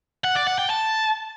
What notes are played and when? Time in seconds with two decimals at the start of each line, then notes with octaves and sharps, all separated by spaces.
0.24 F#5
0.35 D5
0.47 F#5
0.58 G5
0.69 A5